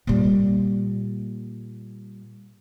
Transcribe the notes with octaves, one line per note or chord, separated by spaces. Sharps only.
A#2 G3